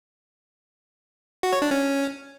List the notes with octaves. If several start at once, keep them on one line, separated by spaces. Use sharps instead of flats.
F#4
C#5
D4
C#4